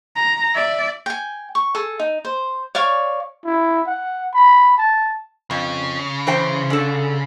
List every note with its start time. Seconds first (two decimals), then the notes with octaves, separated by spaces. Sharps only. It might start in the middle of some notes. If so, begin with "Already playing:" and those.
0.16 A#5
0.54 D5 E5
1.06 G5 G#5
1.55 C#6
1.75 G#4 A4
2.00 D#4
2.25 C5
2.75 C#5 D5 F5 C#6
3.46 E4
3.87 F#5
4.34 B5
4.78 A5
5.51 F2 C#3
6.27 E3 C5 G5
6.70 D3 A4